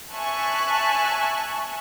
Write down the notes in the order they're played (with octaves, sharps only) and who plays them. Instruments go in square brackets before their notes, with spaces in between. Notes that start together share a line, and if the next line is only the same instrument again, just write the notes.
[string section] E5 G#5 A5 C#6 F#6